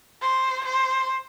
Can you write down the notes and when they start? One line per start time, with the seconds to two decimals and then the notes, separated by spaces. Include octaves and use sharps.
0.22 C5
0.65 C5